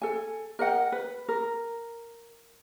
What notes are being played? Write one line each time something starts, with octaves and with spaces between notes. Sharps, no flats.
A4 G#5
A#4 D#5 F#5 G5
B4
A#4